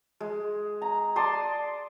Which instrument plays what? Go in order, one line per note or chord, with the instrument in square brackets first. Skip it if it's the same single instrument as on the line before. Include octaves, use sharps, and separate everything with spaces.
[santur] G#3
A#5
D5 A5 C6 D#6